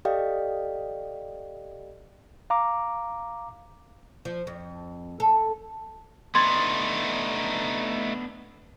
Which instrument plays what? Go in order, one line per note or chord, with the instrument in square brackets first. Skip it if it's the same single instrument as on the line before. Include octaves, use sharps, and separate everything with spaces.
[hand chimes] G4 A4 D5 D#5 F5 G5
[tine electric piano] F5 A#5 D6
[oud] F3
F2
A4
[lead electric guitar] A3 D#4 [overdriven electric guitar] B3 D4 [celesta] C6 G#6 A6